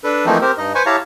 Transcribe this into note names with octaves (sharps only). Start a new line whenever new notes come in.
D4 A4 B4
E3 F3 A3 A#3 C4 D#4
C4 G4 A#4 C5
G2 D#4 D#5
B4 C5 G#5 C#6
E4 G4 C#5 F5 A5 A#5